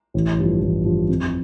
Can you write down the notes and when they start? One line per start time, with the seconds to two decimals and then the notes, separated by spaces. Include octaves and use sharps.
0.14 A1
0.38 G2 F3
0.61 A1
0.85 G2 F3
1.09 F2